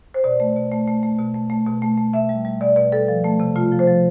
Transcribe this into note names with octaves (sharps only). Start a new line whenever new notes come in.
C5
B2 D5
A3
B2
A3
A3
A3
B2
A3
A3
B2
A3
A3
B2 E5
G3
G3
B2 D5
B2 B4
G3 A4
F3
A3
C3
A3 F4
F3
C5
F3